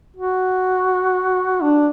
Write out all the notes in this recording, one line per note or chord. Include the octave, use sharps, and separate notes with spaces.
F#4
D4